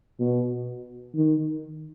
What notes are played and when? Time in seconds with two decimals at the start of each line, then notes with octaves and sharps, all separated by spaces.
0.20 B2
1.15 D#3